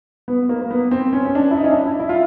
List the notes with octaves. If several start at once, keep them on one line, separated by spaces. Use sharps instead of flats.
B3
A#3
A#3
B3
C4
C#4
C#4
D4
E4
D#4
C#4
D4
E4
E4
F4